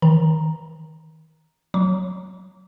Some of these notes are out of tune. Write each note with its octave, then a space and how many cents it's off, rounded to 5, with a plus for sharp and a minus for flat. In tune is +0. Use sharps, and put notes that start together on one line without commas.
D#3 +35 A#5 +0
F#3 +0 D6 -35